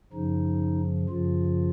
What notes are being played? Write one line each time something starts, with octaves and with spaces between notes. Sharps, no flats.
F#2 C#3 F3 D#4
F#2 C#3 F3 F4